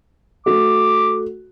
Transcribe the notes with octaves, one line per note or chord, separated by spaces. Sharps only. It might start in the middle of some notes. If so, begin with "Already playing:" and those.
A3 F#4 D6